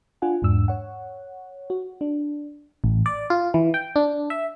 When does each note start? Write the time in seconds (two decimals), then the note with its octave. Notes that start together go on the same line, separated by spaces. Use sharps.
0.22 D4 F4 F#5 G#5
0.42 E2 G#2 D4 E6
0.68 C#5 F#5
1.70 F#4
2.01 D4
2.84 A1
3.06 D5
3.30 F4
3.54 E3
3.74 G5
3.96 D4
4.30 E5